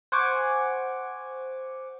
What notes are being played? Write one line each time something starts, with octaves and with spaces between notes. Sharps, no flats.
C5 F#5 G#5 C#6 D6